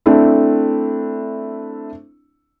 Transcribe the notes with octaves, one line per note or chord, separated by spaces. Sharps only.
A3 C4 D4 E4